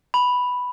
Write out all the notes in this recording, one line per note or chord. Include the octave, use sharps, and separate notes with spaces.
B5